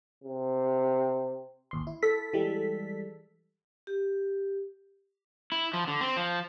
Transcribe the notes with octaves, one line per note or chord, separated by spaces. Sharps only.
C3
A1 D#2 C6
E4
A4 B6
E3 G3 G#3
G4
E4
F3
D3
C4
F3